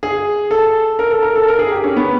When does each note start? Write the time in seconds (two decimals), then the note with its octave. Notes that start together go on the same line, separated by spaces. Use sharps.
0.03 G#4
0.51 A4
0.99 A#4
1.11 A4
1.23 A#4
1.36 A4
1.48 A#4
1.59 G#4
1.72 G4
1.84 C#4
1.96 B3